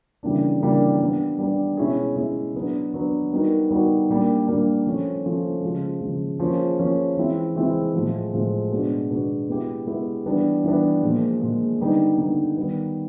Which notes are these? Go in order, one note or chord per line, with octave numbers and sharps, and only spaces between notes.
C#3 E3 G3 A#3 D4
C#3 E3 G3 A#3 D4
G3 B3 D4
G3 B3 D4
B2 G#3 C#4 E4 G#4
B2 G#3 C#4 E4 G#4
F#3 B3 D4
F#3 B3 D4
G3 B3 D#4 F#4 A#4
G3 B3 D#4 F#4 A#4
A#2 G3 A#3 D4
A#2 G3 A#3 D4
F3 A3 C#4
F3 A3 C#4
C#3 F3 G#3
C#3 F3 G#3
F3 A#3 C#4 F4 G#4
F3 A#3 C#4 F4 G#4
E3 G#3 C4 E4
E3 G#3 C4 E4
A2 F3 G#3
A2 F3 G#3
B2 G#3 B3 D4 F#4
B2 G#3 B3 D4 F#4
G#3 B3 E4 G4
G#3 B3 E4 G4
E3 G3 B3 D4
E3 G3 B3 D4
A#2 F3 G#3
A#2 F3 G#3
D3 G3 B3 D#4
D3 G3 B3 D#4
D#3 G3 B3